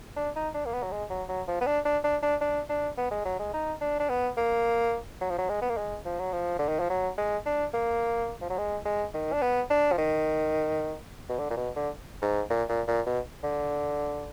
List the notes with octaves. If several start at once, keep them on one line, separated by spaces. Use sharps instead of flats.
D4
D#4
D4
A#3
B3
F#3
G#3
F#3
F#3
F3
B3
D4
D4
D4
D4
D4
D4
B3
G#3
F#3
G#3
D#4
D4
D4
B3
A#3
F#3
F3
F#3
G#3
B3
A#3
G#3
F3
F#3
F3
D3
D#3
F3
F#3
G#3
D4
A#3
F3
F#3
G#3
G#3
D#3
D4
B3
D4
F3
D#3
B2
D3
A#2
B2
D3
G#2
A#2
A#2
A#2
B2
D3